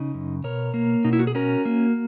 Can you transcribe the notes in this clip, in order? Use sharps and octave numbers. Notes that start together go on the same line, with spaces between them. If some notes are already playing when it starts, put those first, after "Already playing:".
Already playing: C#3 D#4
F#2
B2 A#4 C#5
A#3
B2 D#4
E4
F#4
G#4
C#4 F#4 A#4
A#3